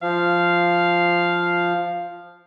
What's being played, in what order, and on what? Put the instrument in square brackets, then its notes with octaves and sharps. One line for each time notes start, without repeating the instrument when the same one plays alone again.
[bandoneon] F3 [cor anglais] F5